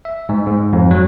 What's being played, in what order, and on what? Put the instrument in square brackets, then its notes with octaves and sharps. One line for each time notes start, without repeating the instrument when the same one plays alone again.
[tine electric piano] E5
G#2
G#2
F2
F#3